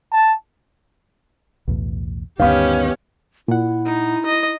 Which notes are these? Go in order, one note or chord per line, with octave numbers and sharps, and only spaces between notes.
A5
B1 E2 A2
D2 G2 D#3 B3 C#4 G4 F5
A#2 E4 F#5
D#4
D#5